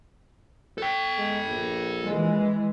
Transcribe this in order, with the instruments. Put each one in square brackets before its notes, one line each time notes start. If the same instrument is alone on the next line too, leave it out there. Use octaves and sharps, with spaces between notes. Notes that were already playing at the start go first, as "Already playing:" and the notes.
[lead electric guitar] A4 G5
[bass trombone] G#3
A#1
[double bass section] E3 G#3